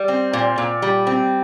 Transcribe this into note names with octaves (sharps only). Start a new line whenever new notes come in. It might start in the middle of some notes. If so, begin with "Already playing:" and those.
Already playing: G3
C4
A#2
A#2
G3
C4